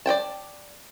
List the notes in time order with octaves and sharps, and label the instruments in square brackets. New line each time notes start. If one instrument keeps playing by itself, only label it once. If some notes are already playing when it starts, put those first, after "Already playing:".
[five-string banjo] D5 D#5 G5 A5